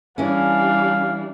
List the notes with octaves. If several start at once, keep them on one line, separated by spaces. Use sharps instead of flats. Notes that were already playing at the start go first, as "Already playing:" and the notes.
E3 G3 C#4 D4 F5